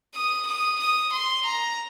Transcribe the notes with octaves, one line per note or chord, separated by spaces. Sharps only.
D#6
D#6
D#6
C6
A#5